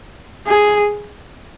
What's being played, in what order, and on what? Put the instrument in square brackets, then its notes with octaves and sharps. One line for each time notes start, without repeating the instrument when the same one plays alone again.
[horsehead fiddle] G#4